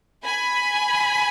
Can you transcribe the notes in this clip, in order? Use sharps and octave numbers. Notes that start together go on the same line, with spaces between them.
G#5 B5